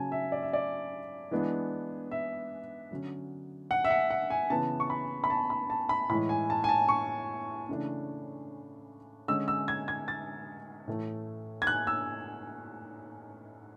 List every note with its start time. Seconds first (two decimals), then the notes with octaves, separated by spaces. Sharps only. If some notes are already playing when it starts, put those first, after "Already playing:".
Already playing: C#3 F#3 C#4 G#5 A5
0.12 E5
0.32 D5
0.43 E5
0.53 D5
1.31 E3 G#3 B3 D4
2.11 E5
2.91 D3 F#3 C#4
3.71 F#5
3.85 E5
3.90 F#5
4.10 F#5
4.30 G#5
4.50 C#3 E3 B3 A5
4.80 C#6
4.90 B5
5.24 B5
5.30 A5
5.50 B5
5.70 A5
5.89 B5
6.10 A2 E3 G#3 B5
6.29 G#5
6.50 A5
6.64 G#5
6.69 A5
6.89 C#6
7.69 C#3 E3 A3 D4
9.28 D3 G#3 C#4 E6
9.48 E6
9.68 G#6
9.88 G#6
10.08 A6
10.88 A2 E3 A3
11.62 G#6
11.67 F#6
11.87 E6